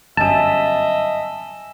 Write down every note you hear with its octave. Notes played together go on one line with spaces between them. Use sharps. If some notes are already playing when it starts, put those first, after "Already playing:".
G1 F#2 D#5 E5 G#5 A5 E7